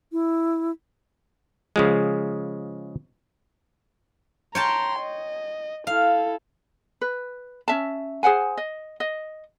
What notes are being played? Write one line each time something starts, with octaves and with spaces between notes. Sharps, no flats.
E4
C#3 F3 G#3
C#5 G5 A5 A#5 C6
D#5
E4 A4 F5
B4
C#4 E5 A5
G#4 C5 F#5 G#5
D#5
D#5